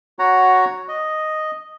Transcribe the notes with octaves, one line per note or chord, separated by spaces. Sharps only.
F#4 C#5 F#5 A#5
D#5